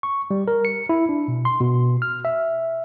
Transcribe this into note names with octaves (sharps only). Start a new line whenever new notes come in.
C#6
G3
A#4
C#7
E4
D4
B2
C6
B2
F6
E5